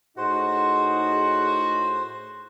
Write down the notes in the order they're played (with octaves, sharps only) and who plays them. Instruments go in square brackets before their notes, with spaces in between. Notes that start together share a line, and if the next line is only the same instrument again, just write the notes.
[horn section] A2 F#4 [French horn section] D#4 G#4 [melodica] C5